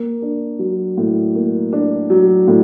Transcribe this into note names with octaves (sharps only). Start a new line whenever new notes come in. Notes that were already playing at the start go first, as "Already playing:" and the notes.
Already playing: A#3
D4
F#3
A2
A#3
D4
F#3
A2